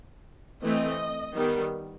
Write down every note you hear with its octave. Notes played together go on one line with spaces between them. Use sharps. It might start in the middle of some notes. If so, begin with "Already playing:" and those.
E3 A3 C4 D#5
D#3 G3 B3